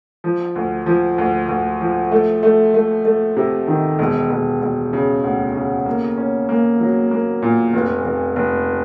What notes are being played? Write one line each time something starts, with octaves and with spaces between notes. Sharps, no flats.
F3
D2
F3
D2
D2
F3
A3
A3
A3
A3
C3
D#3
E1
E1
E1
C#3
D2
C#3
A#3
C#4
A#3
F#3
A#3
A#2
F1
F1
F1